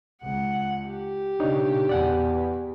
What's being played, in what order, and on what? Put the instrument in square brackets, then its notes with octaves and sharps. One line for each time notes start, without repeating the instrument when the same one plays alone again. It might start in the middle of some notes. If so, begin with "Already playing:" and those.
[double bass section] C#2 [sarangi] F#5
[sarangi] G4
[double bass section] B1 A#2 C#3 [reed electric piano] D4 D#4 C#5
[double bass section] E2 [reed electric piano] D5 F#5 G#5